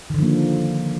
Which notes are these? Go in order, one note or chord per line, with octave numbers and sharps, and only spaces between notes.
D3 D#3 F3 A#3